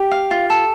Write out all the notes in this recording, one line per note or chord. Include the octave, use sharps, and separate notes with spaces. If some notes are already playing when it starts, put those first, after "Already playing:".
Already playing: G4
F5
F4
A4